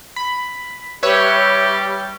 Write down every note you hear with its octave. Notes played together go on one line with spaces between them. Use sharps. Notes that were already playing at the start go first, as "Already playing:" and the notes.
B5
G3 G4 B4 C#5 E5